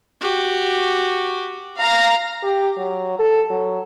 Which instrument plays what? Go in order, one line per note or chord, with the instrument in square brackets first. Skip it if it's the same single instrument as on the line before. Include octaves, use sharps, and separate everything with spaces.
[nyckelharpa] F#4 G4
[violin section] F5 A#5 A#6
[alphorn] G4
F#3
A4
F#3